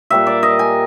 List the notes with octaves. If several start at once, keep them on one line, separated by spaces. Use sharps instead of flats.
A#2 G3 A#3 E5
D5
D#5
G#5